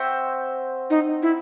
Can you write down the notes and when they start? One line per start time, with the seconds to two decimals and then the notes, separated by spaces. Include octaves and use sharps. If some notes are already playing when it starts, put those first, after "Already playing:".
Already playing: C4 F#4 C5 E5
0.90 D#4
1.23 E4